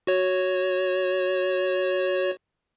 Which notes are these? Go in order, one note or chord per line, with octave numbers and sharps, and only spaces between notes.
F#4 C#5